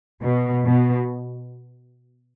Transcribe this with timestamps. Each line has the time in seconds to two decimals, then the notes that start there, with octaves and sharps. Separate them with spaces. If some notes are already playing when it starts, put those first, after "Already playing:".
0.22 B2
0.64 B2